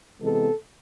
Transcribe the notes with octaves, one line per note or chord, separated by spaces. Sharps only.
C3 E3 G#3 B3 A4